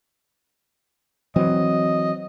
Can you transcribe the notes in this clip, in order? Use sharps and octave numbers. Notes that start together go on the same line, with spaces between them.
E3 F#3 C4 D#5